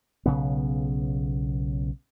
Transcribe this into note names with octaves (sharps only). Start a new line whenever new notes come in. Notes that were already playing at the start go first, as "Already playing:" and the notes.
B1 C#3 B3